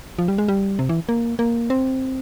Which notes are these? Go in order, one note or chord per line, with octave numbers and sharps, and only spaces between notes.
F3
G3
G#3
G3
C3
E3
A#3
A#3
C4